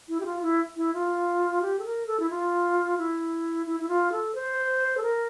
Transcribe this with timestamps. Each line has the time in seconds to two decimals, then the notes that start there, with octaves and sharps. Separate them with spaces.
0.08 E4
0.20 G4
0.26 F4
0.42 E4
0.77 E4
0.94 F4
1.62 G4
1.79 A4
1.85 A#4
2.07 A4
2.20 E4
2.30 F4
2.98 E4
3.66 E4
3.80 E4
3.89 F4
4.12 A4
4.35 C5
4.97 A4
5.03 A#4